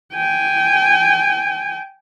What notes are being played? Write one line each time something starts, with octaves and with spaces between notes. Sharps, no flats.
G5 G#5